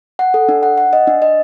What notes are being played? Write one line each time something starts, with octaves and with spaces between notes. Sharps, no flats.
F#5
A4
D4
F#5
F#5
D#5
D4
D#5